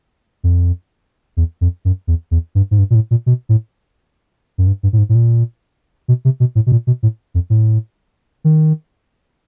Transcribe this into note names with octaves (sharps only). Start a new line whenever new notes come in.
F2
E2
F2
F#2
E2
E2
G2
G#2
G2
A#2
A2
A#2
B2
A2
F#2
G2
G2
A2
G#2
A2
A#2
B2
C3
B2
A2
B2
A#2
B2
A2
F2
A2
D#3